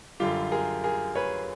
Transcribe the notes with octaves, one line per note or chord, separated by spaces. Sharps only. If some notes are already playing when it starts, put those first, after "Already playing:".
F#2 D3 G3 F4 G4
G#4 A#4
G#4 A#4
B4 C#5